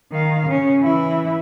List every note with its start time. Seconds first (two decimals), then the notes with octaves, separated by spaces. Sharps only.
0.12 D#3 F5
0.47 C#3 C#4
0.82 E3 E4